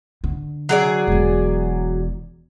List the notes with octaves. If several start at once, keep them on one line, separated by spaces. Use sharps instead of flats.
D3
F#3 G#4 D5
E1 E3